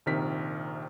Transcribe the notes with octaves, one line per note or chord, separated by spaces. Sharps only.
A#1 C3 D#3 A#4 B6